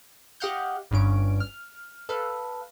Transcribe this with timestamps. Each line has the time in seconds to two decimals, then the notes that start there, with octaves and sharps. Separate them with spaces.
0.40 G4 D#5 F5 F#5 F6 G6
0.91 G1 G2 C#4 D7
1.40 F6
2.09 A4 B4 F5